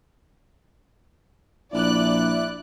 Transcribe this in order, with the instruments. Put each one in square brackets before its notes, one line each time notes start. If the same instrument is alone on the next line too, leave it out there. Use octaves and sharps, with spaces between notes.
[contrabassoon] A#1 [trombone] E4 [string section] D5 F#6